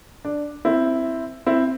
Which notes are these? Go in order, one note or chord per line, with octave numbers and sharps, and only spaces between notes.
D4
C4 E4
C4 E4